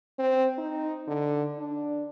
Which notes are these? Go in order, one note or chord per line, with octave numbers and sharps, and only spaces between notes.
C4
D#4
D3
D4